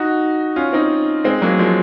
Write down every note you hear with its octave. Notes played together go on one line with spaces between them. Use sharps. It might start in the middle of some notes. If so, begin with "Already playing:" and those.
Already playing: D#4 F#4
C#4 F4
C4 D#4
G#3 C4
F#3 A#3
F3 G#3